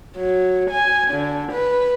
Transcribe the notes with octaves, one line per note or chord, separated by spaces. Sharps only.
F#3
G#5
D3
B4